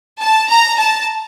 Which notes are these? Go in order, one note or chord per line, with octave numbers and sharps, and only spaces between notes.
A5
A#5
A5